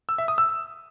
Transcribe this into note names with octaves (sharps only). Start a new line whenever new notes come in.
E6
E5
D#6
E6